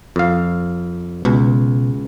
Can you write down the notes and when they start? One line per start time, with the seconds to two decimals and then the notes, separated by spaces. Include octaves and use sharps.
0.16 F2 F5
1.25 C#2 B2